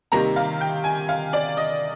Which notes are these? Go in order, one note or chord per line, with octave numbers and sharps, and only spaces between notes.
C3 D#3 G3 A#3 A#5
F5
G5
G#5
F5
D5
D#5